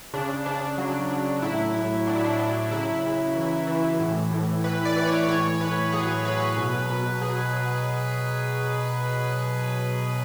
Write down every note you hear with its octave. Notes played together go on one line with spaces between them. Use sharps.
C#3 D4
C#3 D4
F#3
F#3
A2 E4
A2
F#3 D4
E4
D4
F#3 D4
C#3 E4
C#3
E3
E3
A2
A2
E3 B4
D5
E3 D5
C#5
A2 C#5
A2 B4
F#3 G#4
F#3 B4
B2
B2
F#3 G#4
F#3